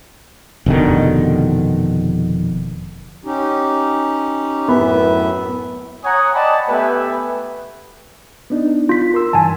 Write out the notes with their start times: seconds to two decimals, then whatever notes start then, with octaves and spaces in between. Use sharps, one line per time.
0.66 F1 B2 D3 D#3
3.25 C#4 D#4 G4
4.68 F#2 A2 B3 E5
6.05 C#5 F#5 G#5 A#5 D#6
6.34 D5 D#5 F#5 G5 A5 B5
6.69 A3 B3 G4 B4 E5 G#5
8.50 B3 D4 D#4
8.89 F4 B6
9.14 A#4 C6 E6
9.33 G2 D#3 E3 G#5 A5